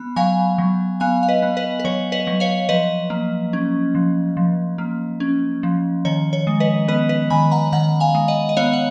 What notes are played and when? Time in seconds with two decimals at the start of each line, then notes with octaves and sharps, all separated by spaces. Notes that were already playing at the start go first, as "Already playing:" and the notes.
Already playing: B3 B5
0.16 F#3 F5 G#5
0.58 F#3
1.00 B3 F5 G#5
1.23 F5
1.28 B4 D#5
1.42 B3
1.57 B4 D#5
1.80 B4
1.85 F#3 C#5
2.12 B4 D#5
2.27 F#3
2.40 C#5 F5
2.69 F3 B4 D#5
3.10 A#3
3.53 C#4
3.95 F3
4.37 F3
4.78 A#3
5.20 C#4
5.63 F3
6.05 D#3 C#5
6.33 C#5
6.47 G#3
6.60 B4 D#5
6.88 B3 B4 D#5
7.09 B4 D#5
7.30 D#3 G#5 B5
7.51 F#5 A#5
7.72 D#3 F#5 A#5
8.00 F5 G#5
8.15 G#3
8.28 D#5 F#5
8.49 D#5
8.57 B3 C#5 F5
8.73 F#5